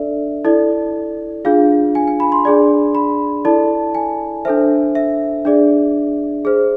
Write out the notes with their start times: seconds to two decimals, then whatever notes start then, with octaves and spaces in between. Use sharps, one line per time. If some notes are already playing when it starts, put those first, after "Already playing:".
Already playing: D4 A4 D5 E5
0.45 E4 A4 D5
1.45 D4 F4 G#4 F5
1.95 G#5
2.07 G#5
2.20 B5
2.32 C6
2.45 D4 G#4 D5
2.95 B5
3.45 E4 A4 D5 A5
3.95 G#5
4.45 D4 A4 C5 E5
4.95 E5
5.45 D4 G#4 D5
6.45 G#4 C5